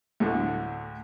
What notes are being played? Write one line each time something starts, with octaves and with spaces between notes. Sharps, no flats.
D2 A2 D3